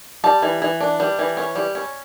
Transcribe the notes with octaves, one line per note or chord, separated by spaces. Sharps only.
G3 A5
E3
E3
D4
G3
E3
C#4
G3
C#4